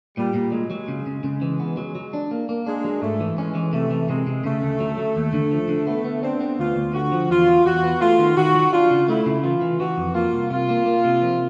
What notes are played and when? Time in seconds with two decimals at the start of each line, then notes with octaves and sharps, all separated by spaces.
0.17 A#2 G3
0.34 A#2
0.52 F#3 G#3
0.71 F#3
0.88 C#3
1.06 C#3
1.24 C#3
1.42 E3
1.60 B3
1.77 F#3
1.95 F#3
2.13 D4
2.31 A#3
2.49 A#3
2.67 G#3 D4
2.84 F#3
3.02 G#2 A3
3.20 E3
3.37 G#3 C#4
3.55 E3
3.73 C3 A3
3.91 E3
4.09 C3 G#3
4.27 C3
4.44 C#3 A3
4.62 D2
4.80 F#3
4.98 F#3
5.16 D#2
5.33 D3
5.51 F3
5.69 D3
5.87 A3 B3
6.04 B3
6.23 C4 D4
6.40 B3
6.59 D2 F4
6.76 D2
6.94 D3 F#4
7.12 F3
7.30 E2 F4
7.47 F#3
7.65 E2 F#4
7.84 B3
8.01 A3 F4
8.19 D#3
8.36 D#3 F#4
8.54 F#3
8.73 D4 F4
8.91 C#3
9.08 A3 E4
9.26 C#3
9.43 E3 F4
9.61 E3
9.80 E3 F#4
9.98 F2
10.14 A#3 F4
10.33 C2
10.50 C3 F4
10.69 A#3
10.86 A#3
11.05 C3
11.22 F3